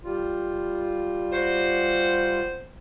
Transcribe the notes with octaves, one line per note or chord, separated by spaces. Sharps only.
G3 F4
F#4 C5